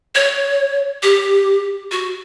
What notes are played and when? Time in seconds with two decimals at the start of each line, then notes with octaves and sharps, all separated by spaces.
0.15 C#5
1.03 G4
1.91 F#4